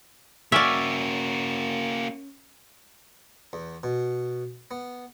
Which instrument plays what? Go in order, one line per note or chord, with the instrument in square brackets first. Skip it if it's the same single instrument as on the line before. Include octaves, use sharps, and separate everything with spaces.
[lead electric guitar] A#3 F#4 [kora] C#4 [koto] D5 E5
[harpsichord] E2
B2
B3